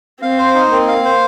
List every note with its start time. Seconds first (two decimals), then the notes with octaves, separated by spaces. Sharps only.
0.22 C4 F5
0.38 C5
0.55 D#4
0.72 A#3 C4
0.88 F5
1.05 C5